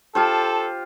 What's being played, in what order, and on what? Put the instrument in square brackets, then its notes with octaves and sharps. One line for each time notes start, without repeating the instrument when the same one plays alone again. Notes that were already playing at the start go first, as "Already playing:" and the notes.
[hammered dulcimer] F4 G4 C5 [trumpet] A4 [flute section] A5